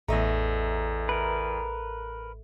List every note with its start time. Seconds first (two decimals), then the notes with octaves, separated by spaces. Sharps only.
0.08 A1 E2 A3 D#5 E5 A#5
1.09 A#4 B4